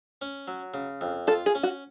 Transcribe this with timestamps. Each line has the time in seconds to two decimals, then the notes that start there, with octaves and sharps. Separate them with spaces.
0.22 C#4
0.48 F#3
0.74 C#3
1.01 F2
1.27 F4 A4
1.46 G#4
1.55 C#4
1.63 F#4